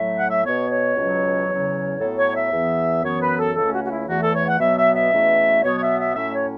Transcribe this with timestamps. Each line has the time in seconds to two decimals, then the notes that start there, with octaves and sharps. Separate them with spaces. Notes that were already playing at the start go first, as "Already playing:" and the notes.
Already playing: A2 F#3 A3 E5
0.18 F#5
0.31 E5
0.45 B2 B3 C#5
0.70 C#5
0.96 C#2 B2 F#3 C#4
1.49 E2 C#3 F#3 C#4
2.00 A2 F#3 B3 A4
2.17 C#5
2.35 E5
2.52 E2 E3 B3
3.04 F#2 E3 B3 C#5
3.21 B4
3.39 A4
3.56 C#2 C#3 A3 C#4 A4
3.73 F#4
3.84 F#4
3.91 E4
4.08 E2 E3 A3 F#4
4.22 A4
4.34 C#5
4.47 F#5
4.59 B2 F#3 B3 E5
4.78 E5
4.95 E5
5.12 E2 B2 A3 C#4
5.64 B2 F#3 B3 C#5
5.77 C#5
5.81 E5
5.99 E5
6.15 A2 F#3 A3 C#4 E5
6.34 C#5